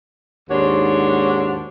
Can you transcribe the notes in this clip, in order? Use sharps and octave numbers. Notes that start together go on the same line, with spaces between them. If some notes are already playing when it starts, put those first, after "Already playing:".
D#2 G#2 D4 F#4 C5 C#5